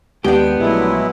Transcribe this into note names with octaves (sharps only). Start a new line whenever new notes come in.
D#2 G#3 B3 D4 G4 G5
A#1 F#3 G#3 A3 E4